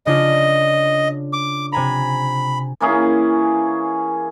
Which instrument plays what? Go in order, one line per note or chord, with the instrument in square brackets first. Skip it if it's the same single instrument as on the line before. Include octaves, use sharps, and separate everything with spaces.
[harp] C#3 D4 F4 [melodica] D#5
[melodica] D6
[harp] C3 G#5 A#5 [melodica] B5
[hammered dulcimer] E3 A#3 C#4 G#4